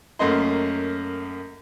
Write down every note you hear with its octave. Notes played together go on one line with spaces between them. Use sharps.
F#2 A3 A#3 D#5 C6